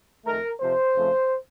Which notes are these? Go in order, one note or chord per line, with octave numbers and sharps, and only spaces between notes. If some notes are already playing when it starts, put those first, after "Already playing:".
F2 D#3 A3 A#4
F2 C3 F3 C5
F2 C#3 F3 A3